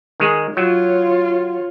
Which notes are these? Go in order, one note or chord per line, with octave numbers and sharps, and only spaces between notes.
D#3 G#3 G#4
F#3 F4 C#5